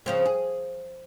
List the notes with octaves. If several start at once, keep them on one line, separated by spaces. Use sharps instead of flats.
C#3 F3 C4
G#4